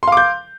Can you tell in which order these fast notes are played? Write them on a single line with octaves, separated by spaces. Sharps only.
C6 F5 D6 G6